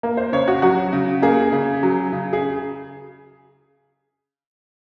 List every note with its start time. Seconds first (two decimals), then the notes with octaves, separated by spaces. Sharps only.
0.03 A#3
0.17 C5
0.33 C#3 C#5
0.48 F#4
0.62 F#3 F#4
0.93 C#3
1.22 A#3 G#4
1.52 C#3
1.83 F#3
2.13 C#3
2.33 G#4